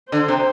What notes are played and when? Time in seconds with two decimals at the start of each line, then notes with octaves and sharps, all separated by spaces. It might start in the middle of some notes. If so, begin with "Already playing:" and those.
0.12 D3 C5
0.28 C3